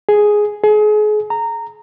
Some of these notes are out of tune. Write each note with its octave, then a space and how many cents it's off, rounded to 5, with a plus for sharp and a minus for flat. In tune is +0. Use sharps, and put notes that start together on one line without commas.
G#4 +5
G#4 +35
A#5 -15